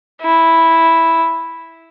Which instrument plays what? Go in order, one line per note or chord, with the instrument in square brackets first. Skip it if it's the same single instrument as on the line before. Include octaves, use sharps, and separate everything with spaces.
[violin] E4